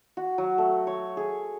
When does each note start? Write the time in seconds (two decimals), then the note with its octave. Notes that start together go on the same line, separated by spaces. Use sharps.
0.17 F#4
0.38 F#3
0.58 A3
0.87 C#5
1.17 G#4